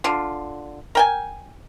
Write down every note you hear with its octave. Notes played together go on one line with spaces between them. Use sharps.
D3 F4
A#4 G5 G#5